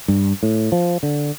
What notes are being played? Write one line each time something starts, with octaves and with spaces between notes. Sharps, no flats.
G2
A2
F3
D3